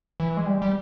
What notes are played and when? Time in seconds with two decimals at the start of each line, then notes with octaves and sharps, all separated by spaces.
0.20 E3
0.37 G#3
0.46 G3
0.62 G3